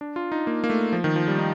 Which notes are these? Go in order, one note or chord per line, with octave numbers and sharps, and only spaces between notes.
D4
F4
D#4
A#3
A#3
A3
F3
D#3
F3
G3
D#4